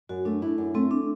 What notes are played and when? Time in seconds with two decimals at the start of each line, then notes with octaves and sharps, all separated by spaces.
0.09 F#2 F#4
0.25 A3 D4
0.42 D4 E4
0.58 F#2
0.74 A3 C4
0.91 D4